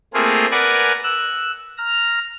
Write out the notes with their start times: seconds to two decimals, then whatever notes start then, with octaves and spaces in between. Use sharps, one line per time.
0.14 A3 A#3 C4 F4 G#4
0.51 A#4 B4 D5 F#5 G#5
1.04 E6 F#6
1.78 A#5 F6